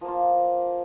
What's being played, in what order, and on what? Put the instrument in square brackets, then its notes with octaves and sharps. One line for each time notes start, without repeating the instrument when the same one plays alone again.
[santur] F3
A#3
F4